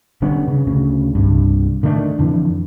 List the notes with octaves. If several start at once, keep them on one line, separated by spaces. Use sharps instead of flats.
D3 G3 B3 C#4
C#3
D2 C#3
C2 G2
D3 D#3 A3 D4
F2 D3 E3